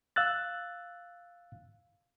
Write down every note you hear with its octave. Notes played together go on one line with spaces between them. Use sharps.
F5 E6 F#6 A6